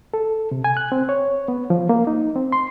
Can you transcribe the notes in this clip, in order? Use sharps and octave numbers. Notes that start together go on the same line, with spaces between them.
A4
C3
G#5
F#6
C4
C#5
B3
F3
A#3
D#4
C4
C6